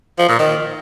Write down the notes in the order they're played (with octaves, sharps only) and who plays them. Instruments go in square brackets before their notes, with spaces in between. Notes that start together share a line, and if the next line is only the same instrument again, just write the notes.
[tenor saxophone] F3
A#2
D#3